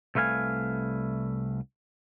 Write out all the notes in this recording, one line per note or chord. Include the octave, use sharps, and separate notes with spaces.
C2 A3 B4 F5 G#5